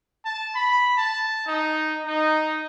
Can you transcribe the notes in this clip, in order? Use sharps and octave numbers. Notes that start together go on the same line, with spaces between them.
A5
B5
A5
D#4
D#4